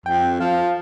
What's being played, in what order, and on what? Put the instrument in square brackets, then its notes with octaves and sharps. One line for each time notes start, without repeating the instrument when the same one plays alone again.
[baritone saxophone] F2 [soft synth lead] G5
[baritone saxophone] F3 [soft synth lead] F5